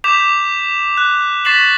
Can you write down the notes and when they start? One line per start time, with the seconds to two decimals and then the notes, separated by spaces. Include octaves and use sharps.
0.04 D6 G6 B6 E7 F7
0.97 F#6
1.45 C#6 A6 B6 C7 E7 F#7